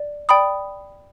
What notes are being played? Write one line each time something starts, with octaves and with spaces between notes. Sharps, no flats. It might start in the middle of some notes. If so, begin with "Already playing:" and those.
Already playing: D5
D5 G5 B5 D#6